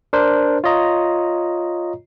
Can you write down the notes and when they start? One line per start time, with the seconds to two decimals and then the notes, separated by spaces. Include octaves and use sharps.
0.13 D4 A#4 C5
0.64 F4 C#5 D#5 A#5